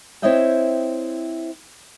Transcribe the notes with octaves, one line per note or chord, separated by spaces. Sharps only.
C4 E4 C#5 D#5 E5 G5